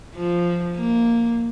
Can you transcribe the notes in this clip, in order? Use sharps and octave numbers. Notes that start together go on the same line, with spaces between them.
F3
A#3